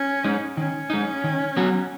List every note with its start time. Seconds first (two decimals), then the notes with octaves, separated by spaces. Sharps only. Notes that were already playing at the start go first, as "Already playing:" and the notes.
Already playing: C#4
0.24 G#3 D#4
0.57 D#3 C#4
0.90 G#3 D#4
1.24 D#3
1.57 F#3 B3 F#4